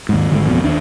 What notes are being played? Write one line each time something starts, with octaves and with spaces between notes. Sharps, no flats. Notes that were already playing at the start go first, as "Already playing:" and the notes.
D#2 G#2
G#1 D3 G#3
A1 F2 B2
D#2 D4